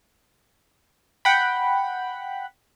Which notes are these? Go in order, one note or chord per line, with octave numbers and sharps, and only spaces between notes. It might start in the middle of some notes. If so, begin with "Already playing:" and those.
F#5 G5 B5